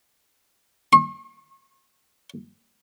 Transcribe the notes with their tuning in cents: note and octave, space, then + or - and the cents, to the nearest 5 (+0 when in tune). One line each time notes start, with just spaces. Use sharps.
C#6 -45